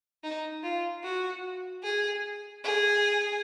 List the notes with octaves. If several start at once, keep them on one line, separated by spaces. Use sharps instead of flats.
D#4
F4
F#4
G#4
G#4